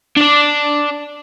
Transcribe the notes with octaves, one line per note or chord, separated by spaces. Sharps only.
D4 D5